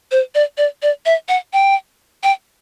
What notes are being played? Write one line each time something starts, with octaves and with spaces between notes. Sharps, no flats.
C5
D5
D5
D5
E5
F#5
G5
G5